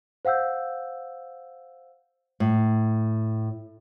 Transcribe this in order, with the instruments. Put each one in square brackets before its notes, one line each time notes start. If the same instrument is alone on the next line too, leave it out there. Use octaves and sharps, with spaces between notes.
[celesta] C5 F5 F#5 E6 G6
[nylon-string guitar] A2